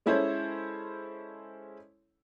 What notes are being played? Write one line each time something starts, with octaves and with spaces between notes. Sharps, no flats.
G#3 C#4 E4 A4 C5 C#5